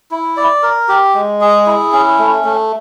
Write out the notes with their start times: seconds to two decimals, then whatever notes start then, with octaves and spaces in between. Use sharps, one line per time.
0.11 E4
0.37 D5
0.63 A#4
0.88 G4
1.15 G#3
1.41 G#4
1.67 E4
1.92 C#4
2.19 A3
2.45 A3